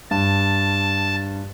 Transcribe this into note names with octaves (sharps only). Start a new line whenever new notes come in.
G2 A5